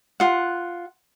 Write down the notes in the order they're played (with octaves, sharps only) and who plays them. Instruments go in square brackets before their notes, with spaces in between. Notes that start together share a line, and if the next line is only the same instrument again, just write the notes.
[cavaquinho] F4 F#5